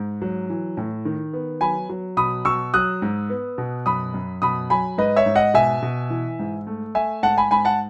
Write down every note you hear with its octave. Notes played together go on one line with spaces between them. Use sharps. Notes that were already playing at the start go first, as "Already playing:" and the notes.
Already playing: G#2
F#3
E3
A2
D#3
B3
F#3 G#5 B5
F#3
B2 B5 D#6
B2 C#6 E6
F#3 D#6 F#6
G#2
B3
B2
F#2 B5 D#6
F#2
B2 B5 D#6
F#3 G#5 B5
G#2 B4 D#5
C#5 E5
G#2
D#5 F#5
B2 E5 G#5
B2
E3
G#2
A3
A3 E5 G#5
G#2 F#5 A5
G#5 B5
G#2 G#5 B5
F#5 A5